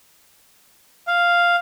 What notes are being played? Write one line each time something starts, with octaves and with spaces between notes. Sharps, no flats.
F5